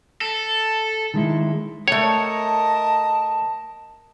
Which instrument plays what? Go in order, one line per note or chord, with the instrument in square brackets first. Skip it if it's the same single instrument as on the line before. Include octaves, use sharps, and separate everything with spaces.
[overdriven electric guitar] A4
[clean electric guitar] D#3 G#3 E4
[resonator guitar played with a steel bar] A3 G5 [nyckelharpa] A#4 D#5 [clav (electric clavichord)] C#5 [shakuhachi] A5